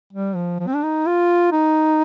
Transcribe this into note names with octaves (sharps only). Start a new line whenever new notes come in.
G3
F3
F3
C4
D4
D#4
F4
D#4